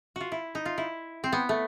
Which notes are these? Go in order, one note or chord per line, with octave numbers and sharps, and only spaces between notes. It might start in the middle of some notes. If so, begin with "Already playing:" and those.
F4 F#4
E4
D#4
F4
E4
C4
B3
A3